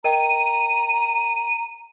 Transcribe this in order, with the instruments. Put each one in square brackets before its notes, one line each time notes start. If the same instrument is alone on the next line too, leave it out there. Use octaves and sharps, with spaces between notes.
[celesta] A#4 D#5 G5 [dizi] A#5 [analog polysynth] D#7